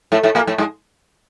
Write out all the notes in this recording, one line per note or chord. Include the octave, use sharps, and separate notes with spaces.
A2 A3
A2 A3
A#2 A#3
A2 A3
G#2 G#3